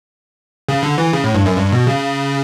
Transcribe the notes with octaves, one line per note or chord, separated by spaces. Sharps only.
C#3
D3
E3
C#3
A2
G2
F#2
G2
B2
C#3